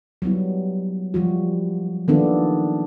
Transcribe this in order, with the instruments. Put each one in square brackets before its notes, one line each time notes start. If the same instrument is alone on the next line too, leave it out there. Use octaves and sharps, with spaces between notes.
[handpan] F#3 G3 B3 E4
F3 G3 F#4
D#3 F3 A#3 B3 D4 A4